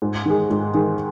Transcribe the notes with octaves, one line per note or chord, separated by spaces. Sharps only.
G#2
D#3 G#3
G#2
D#3 G#3